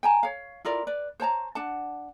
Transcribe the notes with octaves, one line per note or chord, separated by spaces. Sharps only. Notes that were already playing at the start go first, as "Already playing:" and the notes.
G5 G#5 A#5
C#5 F5
E4 F4 A#4 D5
B4 D5
C5 C#5 A5 A#5
D4 F#5 A5